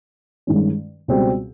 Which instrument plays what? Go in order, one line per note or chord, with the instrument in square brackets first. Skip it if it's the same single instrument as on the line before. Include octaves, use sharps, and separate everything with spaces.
[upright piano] G2 D#3 G#3 C#4
C#2 B2 G3 C4